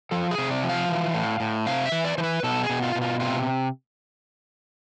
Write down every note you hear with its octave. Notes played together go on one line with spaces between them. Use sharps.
F3 A4
G#4
C3
D5
F3
F5
E3
A2
A2
C3 F5
E5
E3
D5
E3 C5
B4
B2 A4
G#4
B2
F4
B2
F4
C3 F4